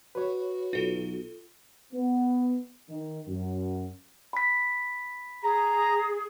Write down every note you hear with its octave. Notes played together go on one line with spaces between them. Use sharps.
F#4 B4 C#5
B1 F4 A4
B3
D#3
F#2
B5 B6
G#4 A#5